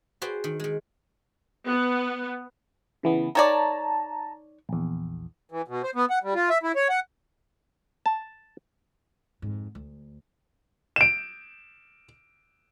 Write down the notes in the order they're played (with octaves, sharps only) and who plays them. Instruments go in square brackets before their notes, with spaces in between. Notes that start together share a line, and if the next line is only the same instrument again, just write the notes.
[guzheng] F#4 G#4 B4 C5 D5 G5
D#3
D#3 G#3
[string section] B3
[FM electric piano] C#3 E3 B3
[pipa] D#3 C#5 D5 [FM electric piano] A5 A#5
[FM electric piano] A#1 E2
[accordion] E3
B2
C5
B3
F#5
G3
F4
E5
E4
C#5
F#5
[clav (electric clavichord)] A5
[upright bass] F2 G#2
D2
[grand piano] D7 E7